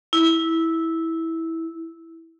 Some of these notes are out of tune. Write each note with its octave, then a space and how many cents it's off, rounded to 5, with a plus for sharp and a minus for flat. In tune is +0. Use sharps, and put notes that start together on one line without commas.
E4 -10